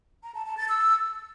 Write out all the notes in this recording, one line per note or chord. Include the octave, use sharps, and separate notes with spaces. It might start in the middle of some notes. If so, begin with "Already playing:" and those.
A#5
A5
A5
A6
E6